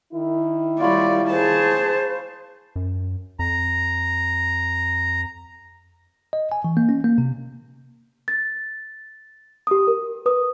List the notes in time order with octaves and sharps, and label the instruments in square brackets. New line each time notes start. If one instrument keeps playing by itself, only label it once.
[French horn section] D#3 E4
[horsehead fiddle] G3 D5 [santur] F4 C#5 B5
[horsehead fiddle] G#4 A5 [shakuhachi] C5
[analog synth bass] F#2
[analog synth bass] F2 [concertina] A#5
[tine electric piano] D#5
G#5
E3
A#3
C#4
A#3
C3
[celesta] A6
G4 D#6
A#4
B4 D#6